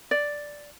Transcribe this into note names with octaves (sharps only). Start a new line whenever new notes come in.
D5